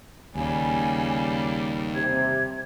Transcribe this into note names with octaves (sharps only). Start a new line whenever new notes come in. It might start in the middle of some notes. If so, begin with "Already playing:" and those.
D#2 C#3 G3 G#5
C3 G#6